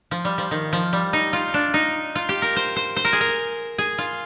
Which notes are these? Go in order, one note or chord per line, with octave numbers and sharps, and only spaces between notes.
F3
G3
F3
D#3
F3
G3
D#4
F4
D4
D#4
F4
G4
A#4
C5
C5
C5
A#4
G#4
A#4
G#4
F4